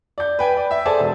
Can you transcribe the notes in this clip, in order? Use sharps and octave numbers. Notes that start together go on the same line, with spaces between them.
D5 G6
B4 G5 G#5
D5
E5
G#4 A4 C5 D5 G#5 A5
E1